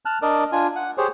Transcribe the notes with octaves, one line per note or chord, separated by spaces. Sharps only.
A5 F6 F#6
D4 A#4 D5 D#5
D4 F4 G#5
F#5
G4 G#4 C5 C#5